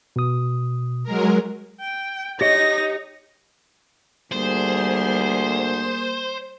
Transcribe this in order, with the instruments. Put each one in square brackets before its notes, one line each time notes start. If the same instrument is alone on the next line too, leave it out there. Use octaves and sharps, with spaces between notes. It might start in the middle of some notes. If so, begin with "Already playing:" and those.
[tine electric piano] B2 D#6
[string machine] F#3 G#3 A#4
[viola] G5
[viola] D#4 [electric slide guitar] G4 C#5 D#5 [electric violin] A#6
[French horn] D2 [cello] G3 G#4 [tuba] A#3 [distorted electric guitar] C5